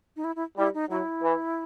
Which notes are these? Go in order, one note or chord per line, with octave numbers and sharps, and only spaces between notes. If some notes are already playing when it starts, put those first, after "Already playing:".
D#4
E4
E4
G3 E4
D#4
F#3 E4
E3